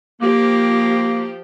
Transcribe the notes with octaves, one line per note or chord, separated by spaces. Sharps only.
F3 A#3 G4